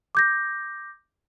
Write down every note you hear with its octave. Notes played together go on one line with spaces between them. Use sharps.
D6 G6 A#6